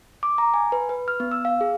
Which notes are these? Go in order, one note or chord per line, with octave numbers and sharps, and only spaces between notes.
D6
A#5
G#5
B4
B4
F6
B3
E6
F5
G#4